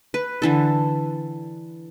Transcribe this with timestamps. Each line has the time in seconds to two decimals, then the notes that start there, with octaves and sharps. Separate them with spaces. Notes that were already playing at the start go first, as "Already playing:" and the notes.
0.14 B4
0.42 D3 E3 A4